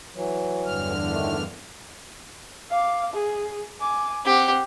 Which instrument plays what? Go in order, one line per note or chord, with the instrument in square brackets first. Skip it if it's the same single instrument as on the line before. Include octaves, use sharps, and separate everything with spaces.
[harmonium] E3 F#3
[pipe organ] E2 D3 F6 [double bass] G2
[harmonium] A2 D#3 A3
[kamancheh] F5 D6
G#4
G#5 D6
[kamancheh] C4 F#5 [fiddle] G4